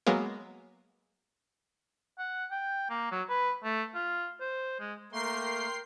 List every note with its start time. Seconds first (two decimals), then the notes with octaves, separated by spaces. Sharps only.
0.07 F#3 G#3 A#3 B3
2.19 F#5
2.51 G5
2.90 A#3
3.12 F#3
3.29 B4
3.64 A3
3.95 F4
4.41 C5
4.80 G#3
5.12 A3 A#3 A#4 G5 C6 C7